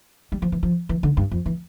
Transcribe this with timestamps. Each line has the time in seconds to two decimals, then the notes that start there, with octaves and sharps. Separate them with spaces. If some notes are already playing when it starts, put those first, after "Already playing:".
0.32 G3
0.42 F3
0.52 E3
0.63 F3
0.89 E3
1.03 D3
1.17 G2
1.31 F2
1.46 E3